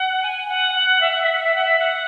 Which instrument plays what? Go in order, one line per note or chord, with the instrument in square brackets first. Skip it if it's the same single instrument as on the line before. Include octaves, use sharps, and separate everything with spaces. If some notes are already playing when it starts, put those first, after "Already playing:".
Already playing: [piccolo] F#5
G#5
F#5
F#5
E5
F#5
E5
F#5
E5
F#5
E5
F#5